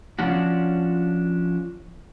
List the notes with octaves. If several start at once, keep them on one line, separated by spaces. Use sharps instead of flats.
F3 C#4 D4 F#4